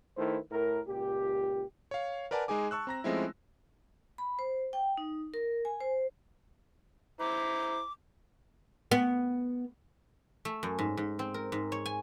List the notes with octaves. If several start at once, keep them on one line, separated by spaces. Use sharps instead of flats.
D#3 A3 E4 B4 C5
A2 A#4
C#2 A#2 G4
C#5 F5
A#4 B4 D5 F#5 G#5 A5
G#3 D#4 G#4 G#5 D6
A5 C#6 E6 F#6
C4 A#5 A#6
F3 G#3 A3 C4 C#4 E4
B5
C5
G5
D#4
A#4
G#5
C5
E4 C5 A#5 D6
B3
A3
F#2
G#2
G#2
C4
A#4
G#2
C#5
G#5